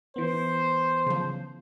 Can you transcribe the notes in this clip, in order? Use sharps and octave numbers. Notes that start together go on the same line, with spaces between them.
E3 B3 C5
C#3 F3